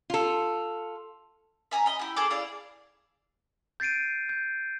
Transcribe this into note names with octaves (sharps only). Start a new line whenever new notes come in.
F4 A4
E5 G#5 A#5
D#5 B5
E4 G4
G#4 A4 D6
E4 G#4 D5 F5
G6 A6 C7 D7 D#7
G6